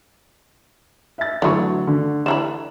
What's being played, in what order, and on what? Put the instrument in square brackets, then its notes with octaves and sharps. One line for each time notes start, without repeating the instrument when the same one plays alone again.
[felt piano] E5 A6
[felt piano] D3 F#3 C#6 [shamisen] E3 A3
[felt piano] D3
[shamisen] D3 E3 B5 [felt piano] E7